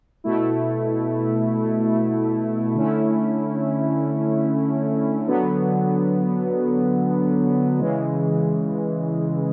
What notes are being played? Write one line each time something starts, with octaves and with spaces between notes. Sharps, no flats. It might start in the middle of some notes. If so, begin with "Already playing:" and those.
B2 A3 E4
D3 A3 C#4 E4
D3 F#3 B3
C#3 E3 G#3